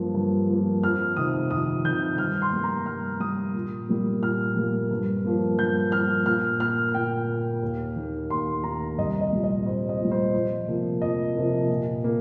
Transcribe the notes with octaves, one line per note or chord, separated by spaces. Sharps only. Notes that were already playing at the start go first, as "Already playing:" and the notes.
Already playing: G2 F3 A#3
G2
F3 A#3
F2 F6
C3 D#3 D#6
F2 D#6
C3 D#3 G6
G2 F6
C6
G3 A#3
A#5
G2 F6
G3 A#3 D#6
A#2
G3 A#3
A#2 F6
G3 A#3
G2
F3 A#3
G2 G6
F3 A#3 F6
A#2 F6
A#3 F6
A#2 G5
A#3
D#2
D#3 A#3
D#2 C6
D#3 A#3 A#5
C2 D#5
D#5
A#2 G3
D#5
C2 C5
D#5
A#2 G3
C5
F2
C3 F3 A#3
F2 D#5
C3 F3 A#3
A#2
A#3